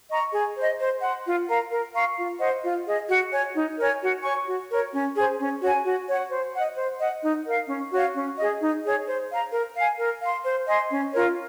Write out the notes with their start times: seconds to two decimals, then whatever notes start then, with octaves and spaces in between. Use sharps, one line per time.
0.10 D#5 A#5 C#6
0.33 G#4
0.57 C5 D#5
0.79 C5
1.02 F#5 C6
1.25 F4
1.48 A#4 F5 A#5
1.71 A#4
1.94 F5 A#5 C#6
2.17 F4
2.40 C5 D#5 F#5
2.63 F4
2.86 G#4 D#5
3.09 F#4
3.32 C#5 G#5
3.55 D#4
3.77 A#4 C#5 G#5
4.01 F#4
4.24 C#5 G#5 C#6
4.47 F#4
4.70 A#4 C#5
4.93 C#4
5.15 G#4 C5
5.39 C#4
5.62 F#4 C#5 G#5
5.85 F#4
6.08 C#5 F#5
6.31 C5
6.53 D#5 F#5
6.77 C5
7.00 D#5 F#5
7.23 D#4
7.45 A#4 F5
7.68 C#4
7.92 F#4 C#5 F5
8.14 C#4
8.38 G#4 D#5
8.60 D#4
8.83 G#4 C#5
9.06 C5
9.30 F5 A#5
9.52 A#4
9.76 F5 G#5
9.98 A#4
10.22 F5 C6
10.45 C5
10.67 D#5 G#5 C6
10.91 C#4
11.14 F4 A#4 C#5